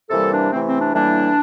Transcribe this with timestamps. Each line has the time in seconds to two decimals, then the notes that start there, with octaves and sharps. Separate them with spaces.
0.10 C3 E3 G3 A#3 A4
0.31 D4
0.52 C3 E3 A3 C4
0.66 C4
0.79 D4
0.93 A2 E3 G3 A#3 D4